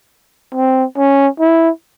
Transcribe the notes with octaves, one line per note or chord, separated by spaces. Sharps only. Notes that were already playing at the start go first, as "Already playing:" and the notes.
C4
C#4
E4